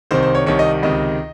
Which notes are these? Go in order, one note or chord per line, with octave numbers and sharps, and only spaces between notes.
C2 C3 D#3 C5
C5
C#5
C2 C3 D#3 C#5
D#5
C#2 C3 D#3 D#5